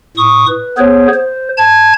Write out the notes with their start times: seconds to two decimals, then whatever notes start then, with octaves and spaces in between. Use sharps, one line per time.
0.17 A2 C#6 D#6
0.48 B4
0.78 B3 G#4 C5 C#5
1.14 C5
1.57 A5 G#6